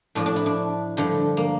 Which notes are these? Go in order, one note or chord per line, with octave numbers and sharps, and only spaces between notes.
A2 F3 D4
D4
E4
D4
G2 D3 F3
A#3